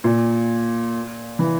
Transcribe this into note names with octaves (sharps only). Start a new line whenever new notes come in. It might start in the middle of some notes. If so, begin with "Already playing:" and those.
A#2
E3